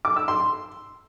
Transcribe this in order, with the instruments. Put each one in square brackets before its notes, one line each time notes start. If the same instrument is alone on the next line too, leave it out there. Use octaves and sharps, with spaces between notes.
[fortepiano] D6
E6
C6